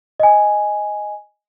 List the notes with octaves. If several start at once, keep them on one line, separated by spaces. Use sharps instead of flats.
D#5 G#5